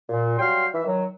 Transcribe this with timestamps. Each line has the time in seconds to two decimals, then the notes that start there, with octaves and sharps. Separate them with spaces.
0.09 A#2
0.38 F#3 G3 F5 G5 C6
0.73 E3 E5
0.84 D#3 F#3